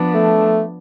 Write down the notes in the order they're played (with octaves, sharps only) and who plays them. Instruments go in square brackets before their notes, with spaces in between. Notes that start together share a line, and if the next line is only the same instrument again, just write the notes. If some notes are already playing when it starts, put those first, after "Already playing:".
Already playing: [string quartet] F3 B3 D4
[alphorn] A3